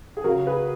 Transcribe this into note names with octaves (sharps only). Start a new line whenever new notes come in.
G#4
C#3 F#3 F#4 A#4
G#4 B4